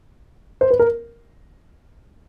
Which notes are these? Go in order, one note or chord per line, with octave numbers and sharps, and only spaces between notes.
C5
B4
A#4